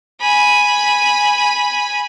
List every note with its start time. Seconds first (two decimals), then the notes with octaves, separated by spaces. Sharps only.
0.21 G#5 B5